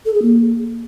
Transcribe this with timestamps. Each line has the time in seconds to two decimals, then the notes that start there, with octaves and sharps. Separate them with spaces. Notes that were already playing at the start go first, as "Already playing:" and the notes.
0.05 A4
0.14 G#4
0.22 A#3